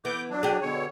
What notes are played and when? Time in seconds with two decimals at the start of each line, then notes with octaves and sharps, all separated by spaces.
0.05 E3 B3 D6 G6
0.30 F#3 D4
0.43 G4 G#4
0.61 B2 D3 C#5